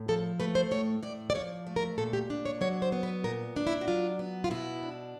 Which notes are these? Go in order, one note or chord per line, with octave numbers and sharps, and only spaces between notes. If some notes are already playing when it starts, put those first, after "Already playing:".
Already playing: A2
F3 A4
A3 B4
C5
A2 C#5
A2 D5
D5
F3 C#5
A3
A#4
A#2 A4
G4
D4
C#5
F#3 C#5
C5
B3
B4
A#2 A#4
D4
E4
F#4
F#3 F4
B3
F4
B2 E4
D4